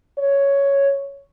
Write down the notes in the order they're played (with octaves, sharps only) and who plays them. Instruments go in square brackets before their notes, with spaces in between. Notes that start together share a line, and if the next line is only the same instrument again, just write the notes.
[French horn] C#5